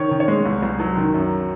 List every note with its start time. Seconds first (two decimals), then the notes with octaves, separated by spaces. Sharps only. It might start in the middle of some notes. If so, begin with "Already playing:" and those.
Already playing: D#3 C#5
0.11 D#3
0.20 C#5
0.28 G#3
0.45 C2
0.63 C2
0.80 F#3
0.97 D#3
1.14 F#2